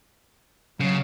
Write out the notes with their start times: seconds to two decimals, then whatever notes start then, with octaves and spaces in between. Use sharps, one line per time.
0.81 C#3 F#3